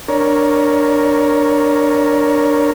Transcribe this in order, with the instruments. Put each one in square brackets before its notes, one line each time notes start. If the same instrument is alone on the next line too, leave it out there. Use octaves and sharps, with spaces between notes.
[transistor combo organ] D4 A#4 C#5